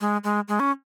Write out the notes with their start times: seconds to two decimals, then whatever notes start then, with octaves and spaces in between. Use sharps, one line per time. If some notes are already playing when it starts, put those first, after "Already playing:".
0.01 G#3
0.24 G#3
0.48 G#3
0.60 C#4